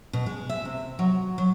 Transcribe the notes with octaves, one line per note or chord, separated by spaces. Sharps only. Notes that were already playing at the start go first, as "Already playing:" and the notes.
B2
G#3
E5
C3
F#3
F#3